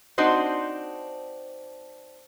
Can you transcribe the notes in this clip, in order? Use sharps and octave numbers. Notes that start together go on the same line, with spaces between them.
C4 D4 D#4 F#4 C5